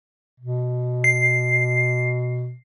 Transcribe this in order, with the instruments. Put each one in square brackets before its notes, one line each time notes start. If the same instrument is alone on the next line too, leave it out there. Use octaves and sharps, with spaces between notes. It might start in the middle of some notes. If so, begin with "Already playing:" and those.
[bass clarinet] B2
[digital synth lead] C7